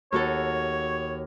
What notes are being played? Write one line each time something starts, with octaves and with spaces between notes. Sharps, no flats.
D#2 F#4 A4 C#5